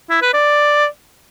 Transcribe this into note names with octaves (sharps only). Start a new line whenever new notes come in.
E4
B4
D5